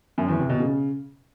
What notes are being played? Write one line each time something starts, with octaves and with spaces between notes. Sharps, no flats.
F#2
E2
C3
B2
C#3